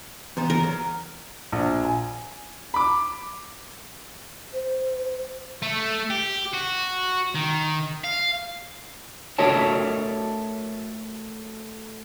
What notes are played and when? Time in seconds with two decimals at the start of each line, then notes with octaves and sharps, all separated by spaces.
0.37 E2 B3 D#4 C5
0.50 A#4
0.63 F#3
1.53 A#1
1.85 G#5
2.74 B5 D6
4.53 C5
5.63 A3
6.10 G4
6.53 F#4
7.35 D#3
8.04 F5
9.38 A3 F#4 A#4 C#5 A5